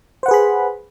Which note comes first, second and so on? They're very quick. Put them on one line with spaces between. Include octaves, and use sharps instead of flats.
C5 F#5 B4 G#4 B5